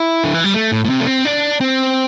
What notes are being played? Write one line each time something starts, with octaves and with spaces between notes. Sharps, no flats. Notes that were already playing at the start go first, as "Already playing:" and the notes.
Already playing: E4
D3
E3
G3
A3
A2
A2
C3
A3
C4
D4
C4